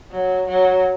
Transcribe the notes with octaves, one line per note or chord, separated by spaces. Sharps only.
F#3
F#3